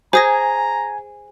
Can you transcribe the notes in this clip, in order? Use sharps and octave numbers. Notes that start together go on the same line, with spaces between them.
G#4 C5 G#5 A#5 D#6 A#6